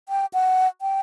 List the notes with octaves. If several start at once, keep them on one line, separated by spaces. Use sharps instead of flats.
G5
F#5
G5